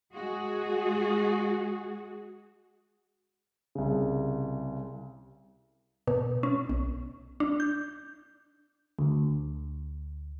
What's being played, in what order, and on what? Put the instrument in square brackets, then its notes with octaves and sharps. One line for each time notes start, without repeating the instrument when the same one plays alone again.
[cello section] G#3 F#4 G#4
[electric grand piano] C2 C#3
[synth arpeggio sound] B2
C#4
B1
D4
G6
[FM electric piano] D2